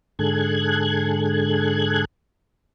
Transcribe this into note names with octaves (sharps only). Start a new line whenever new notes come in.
G#2 D3 G#4 A4 F#6 G#6